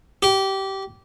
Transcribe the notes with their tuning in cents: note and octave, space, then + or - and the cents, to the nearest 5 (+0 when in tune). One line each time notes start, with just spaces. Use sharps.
G4 -20